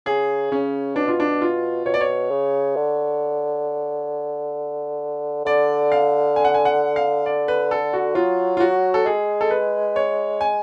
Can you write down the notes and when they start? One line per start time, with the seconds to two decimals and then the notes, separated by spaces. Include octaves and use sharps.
0.06 C#3 G#4
0.51 C#3 C#4
0.96 B2 D4
1.08 F4
1.20 D4
1.42 F4
1.86 B2 C#5
1.94 D5
2.01 C#5
2.31 C#3
2.76 D3
5.45 D3 D5
5.92 F5
6.36 G#5
6.45 F#5
6.54 G#5
6.65 F#5
6.96 F5
7.26 D5
7.48 B4
7.71 A4
7.93 F#4
8.15 F#3 F4
8.57 F4
8.60 F#4
8.94 A4
9.05 G#3 G#4
9.41 A4
9.51 B4
9.96 C#5
10.41 G#5